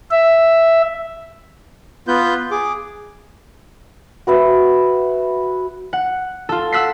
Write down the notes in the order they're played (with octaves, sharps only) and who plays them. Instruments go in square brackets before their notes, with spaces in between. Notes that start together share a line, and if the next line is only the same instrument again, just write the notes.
[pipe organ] E5
[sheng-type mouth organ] B3 F4 B4 G6
G#4 D6
[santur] F#4 B4 E5
[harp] F#5
F4 A4
F#5 E6 F#6 B6 C7